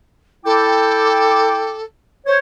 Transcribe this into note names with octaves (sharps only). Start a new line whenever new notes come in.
E4 A4 G5 D6
C5 C#5